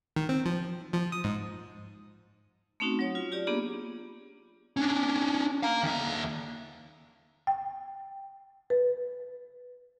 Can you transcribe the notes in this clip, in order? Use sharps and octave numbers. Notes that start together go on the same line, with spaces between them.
D#3
C4
F3
F3
D#6
G#2
A3 C4 C#4 D#4 F#4
F#3 C#5
F4
F4 G4 D5
A#3 B3 D4 G4 G#4
C#4 D4
F5 A#5
D#2 E5
G5
B4